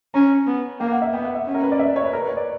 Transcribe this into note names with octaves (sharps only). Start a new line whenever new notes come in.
C#4 A#5
B3
A#3 G5
F#5
E5
B3 G5
F#5
E5
C#4
A#4
B4
D5
E5
D5
C#5
B4
A#4
B4
C#5
D5